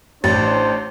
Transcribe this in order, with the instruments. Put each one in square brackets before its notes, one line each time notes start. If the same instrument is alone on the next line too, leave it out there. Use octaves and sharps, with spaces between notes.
[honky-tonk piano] A1 [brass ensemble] D4 C5 [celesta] A6